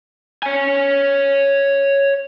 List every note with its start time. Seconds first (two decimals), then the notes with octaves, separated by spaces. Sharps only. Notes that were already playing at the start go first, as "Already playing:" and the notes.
0.43 C#5 G#5